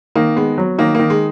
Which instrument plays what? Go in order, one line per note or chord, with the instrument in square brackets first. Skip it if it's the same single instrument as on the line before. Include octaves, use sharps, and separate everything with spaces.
[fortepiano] D#3 [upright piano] A#3
[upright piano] G#3 [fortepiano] B3
[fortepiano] F#3
[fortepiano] D#3 [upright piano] A#3
[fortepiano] D#3 [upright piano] A#3
[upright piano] G#3